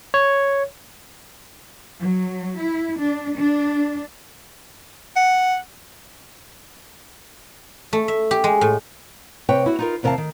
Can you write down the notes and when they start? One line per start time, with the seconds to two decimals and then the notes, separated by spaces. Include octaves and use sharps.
0.14 C#5
1.99 F#3
2.59 E4
3.00 D4
3.35 D4
5.16 F#5
7.93 A3
8.08 E5
8.31 G4
8.44 G#3
8.61 A2
9.49 C3 B4 C#5 G5
9.66 E4 F#4
9.79 D#4 F4 A#4
10.03 E2 C3 A#4 D5 F5 A5
10.18 D#3